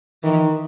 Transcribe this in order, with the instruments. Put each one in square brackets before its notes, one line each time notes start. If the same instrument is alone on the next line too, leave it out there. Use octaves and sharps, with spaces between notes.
[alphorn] D#3 [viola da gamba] E3